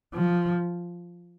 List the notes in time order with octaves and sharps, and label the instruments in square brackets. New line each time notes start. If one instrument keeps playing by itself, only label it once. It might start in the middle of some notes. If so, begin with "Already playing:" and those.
[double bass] F3